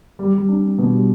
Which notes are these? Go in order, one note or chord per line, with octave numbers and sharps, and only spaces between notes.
G3
G3
D4
D4
B2
G3